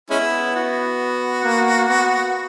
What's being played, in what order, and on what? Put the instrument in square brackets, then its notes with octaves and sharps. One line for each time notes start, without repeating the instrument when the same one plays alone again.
[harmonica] G#3 C#4 E4 [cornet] B3
[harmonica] F#4
[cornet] A#3
B3